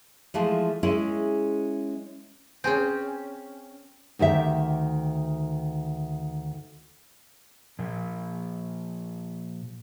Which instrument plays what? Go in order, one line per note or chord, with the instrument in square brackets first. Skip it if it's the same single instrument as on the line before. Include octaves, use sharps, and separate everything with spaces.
[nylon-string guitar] E3 F3 G#3 A3
G#3 C#4 E4 G#4
[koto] C4 C#4 [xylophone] G#4 G#5 G6
[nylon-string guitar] D2 D#3 G4 E5
[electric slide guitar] A#2 F3